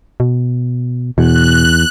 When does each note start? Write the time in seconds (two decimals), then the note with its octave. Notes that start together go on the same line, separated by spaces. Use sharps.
0.20 B2
1.18 E2 B2 F#6